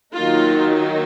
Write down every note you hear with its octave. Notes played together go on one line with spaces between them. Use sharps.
D#3 F#3 A#3 D#4 F4